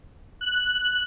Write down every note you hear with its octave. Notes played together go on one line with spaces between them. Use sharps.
F#6